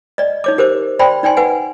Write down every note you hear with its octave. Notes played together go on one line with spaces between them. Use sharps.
D5 D#5
D#4 C#5 D6
G4 A#4 C5 D6
C5 D5 G5 A5 B5 C6
D#4 D5 G5 G#5 C6
B4 F#5 G#5